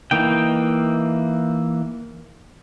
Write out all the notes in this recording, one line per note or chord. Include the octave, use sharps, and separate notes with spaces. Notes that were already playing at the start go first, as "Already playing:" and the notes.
E3 A#3 D#4 G5